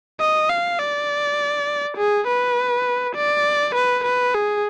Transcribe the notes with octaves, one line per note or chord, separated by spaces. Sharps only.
D#5
F5
D5
G#4
B4
D5
B4
B4
G#4